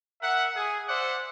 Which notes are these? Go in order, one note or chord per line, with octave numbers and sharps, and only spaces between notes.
A#4 E5 F#5
G#4
C5 D5 E5 F#5